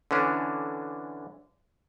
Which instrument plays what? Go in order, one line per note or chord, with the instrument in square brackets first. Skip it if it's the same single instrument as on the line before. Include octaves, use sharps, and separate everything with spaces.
[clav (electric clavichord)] D3 E3 C#4 D4